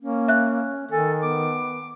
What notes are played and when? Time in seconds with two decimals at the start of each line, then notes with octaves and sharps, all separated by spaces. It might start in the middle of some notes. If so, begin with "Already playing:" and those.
0.01 A#3 C#4
0.28 E5 F#6
0.91 D#3 A4 G#5
1.22 B3 D6